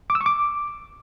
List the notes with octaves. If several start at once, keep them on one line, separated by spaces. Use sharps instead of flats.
D6
E6
C#6
D6